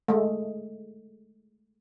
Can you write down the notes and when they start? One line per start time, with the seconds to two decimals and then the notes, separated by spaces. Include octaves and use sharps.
0.08 G#3 A3